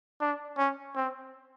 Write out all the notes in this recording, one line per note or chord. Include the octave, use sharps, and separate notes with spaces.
D4
C#4
C4